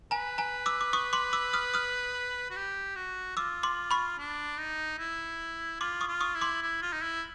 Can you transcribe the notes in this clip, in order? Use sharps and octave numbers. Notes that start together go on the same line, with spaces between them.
B4 G#5 A#5
G#5 A#5
D6 E6
D6
C#6 D#6
C6 D6
D6 E6
D#6 F6
D#6 F6
F#4
G4
F#4
F4 D6 E6
C6 D6
B5 C#6
D4
D#4
E4
F4 C6 D6
C#6 D#6
F4
C#6 D#6
E4
C6 D6
E4
F4
D#4
E4